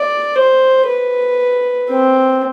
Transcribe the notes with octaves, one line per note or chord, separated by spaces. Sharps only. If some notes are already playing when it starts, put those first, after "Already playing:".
Already playing: D5
C5
B4
C4